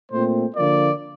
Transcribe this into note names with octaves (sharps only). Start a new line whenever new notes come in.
A#2 A3 C4 C5
D3 F3 A#3 D5